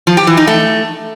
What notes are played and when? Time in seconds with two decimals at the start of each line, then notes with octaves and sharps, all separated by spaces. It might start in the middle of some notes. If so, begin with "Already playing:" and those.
0.07 F3
0.17 G4
0.27 E3
0.37 D#4
0.47 A3